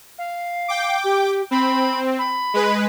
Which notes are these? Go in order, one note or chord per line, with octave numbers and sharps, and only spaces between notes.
F5
G5 D6
G4
C4 B5
B5
G#3 B4